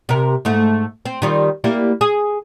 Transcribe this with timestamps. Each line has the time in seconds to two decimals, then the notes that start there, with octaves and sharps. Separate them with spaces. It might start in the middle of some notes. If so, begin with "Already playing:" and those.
0.09 C3 A#4
0.45 G#2 A3
1.05 C4
1.22 D#3 G3 F4
1.64 G3 A#3 E4
2.01 G#4